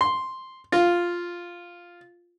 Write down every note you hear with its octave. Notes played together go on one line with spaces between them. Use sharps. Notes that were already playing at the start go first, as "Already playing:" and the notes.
C6
F4